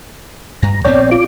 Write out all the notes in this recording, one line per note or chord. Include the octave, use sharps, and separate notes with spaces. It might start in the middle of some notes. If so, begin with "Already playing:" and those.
G2 A#5
A#1 B3 C4 C#5 D5 G5
F4 D6